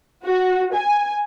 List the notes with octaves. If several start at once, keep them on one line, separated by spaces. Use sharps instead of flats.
F#4
G#5